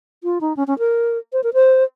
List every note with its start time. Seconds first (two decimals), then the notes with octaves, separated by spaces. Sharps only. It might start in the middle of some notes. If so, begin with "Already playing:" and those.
0.24 F4
0.41 D#4
0.57 C#4
0.67 C#4
0.79 A#4
1.33 C5
1.44 A#4
1.54 C5